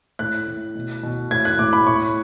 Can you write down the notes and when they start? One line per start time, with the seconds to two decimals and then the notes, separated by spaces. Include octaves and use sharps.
0.19 A2 F#6
0.48 A2
0.75 B2
1.03 B2
1.31 A2 G#6
1.45 F#6
1.59 A2 D6
1.73 B5
1.87 A2 C#6